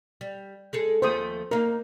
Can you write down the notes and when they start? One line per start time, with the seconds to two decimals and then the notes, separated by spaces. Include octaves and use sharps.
0.21 G3
0.73 G#3 G#4 A4
1.02 D#2 F3 A3 C5 D#6
1.51 A#3 D#4 A#4